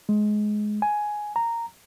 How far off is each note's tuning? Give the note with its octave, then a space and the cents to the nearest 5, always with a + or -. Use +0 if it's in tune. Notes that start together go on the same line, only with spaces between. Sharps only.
G#3 +20
G#5 +10
A#5 -10